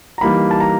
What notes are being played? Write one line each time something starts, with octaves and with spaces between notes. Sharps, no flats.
A#5
E3 G3 A#3 D#4 B5
A5
A#5